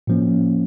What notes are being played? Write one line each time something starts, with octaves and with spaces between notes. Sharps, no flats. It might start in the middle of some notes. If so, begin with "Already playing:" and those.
A2 F3 A#3 C#4